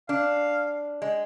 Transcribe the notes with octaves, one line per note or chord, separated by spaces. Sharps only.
D4 F5
G#3